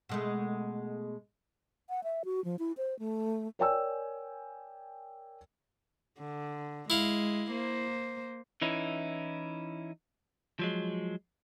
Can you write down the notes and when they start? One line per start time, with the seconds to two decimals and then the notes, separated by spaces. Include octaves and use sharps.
0.09 B2 G#3 A3
1.89 F#5
2.04 E5
2.25 F#4
2.45 F3
2.59 E4
2.77 C5
2.99 A3
3.59 A#4 C#5 D5 G5 G#5 E6
6.19 D3
6.90 G#3 E4 F5
7.51 A#3 C5
8.62 E3 C#4 D#4 E4
10.59 F3 F#3 G#3